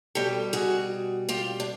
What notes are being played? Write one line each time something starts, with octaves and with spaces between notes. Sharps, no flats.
B2 G3 G4 A4
F#4 G#4
F4 G4
D4